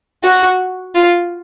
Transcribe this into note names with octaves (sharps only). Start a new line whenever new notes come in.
F#4
F4